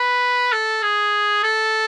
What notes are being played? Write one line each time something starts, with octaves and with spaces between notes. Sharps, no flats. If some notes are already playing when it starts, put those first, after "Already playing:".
Already playing: B4
A4
G#4
A4